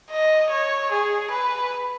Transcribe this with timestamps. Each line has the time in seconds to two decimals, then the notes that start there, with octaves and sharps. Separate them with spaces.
0.12 D#5
0.51 C#5
0.92 G#4
1.31 B4